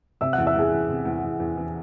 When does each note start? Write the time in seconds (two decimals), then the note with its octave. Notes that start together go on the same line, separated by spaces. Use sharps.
0.21 C3 E5 E6
0.33 F#5 F#6
0.38 E2
0.47 E5 E6
0.55 E2 G#4 G#5
0.72 E2
0.89 C3
1.05 E2
1.23 E2
1.40 E2
1.57 E3